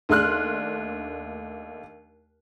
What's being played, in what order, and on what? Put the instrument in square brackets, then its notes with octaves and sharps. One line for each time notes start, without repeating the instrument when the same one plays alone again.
[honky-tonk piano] D#2 A3 D4 C6 F6 F#6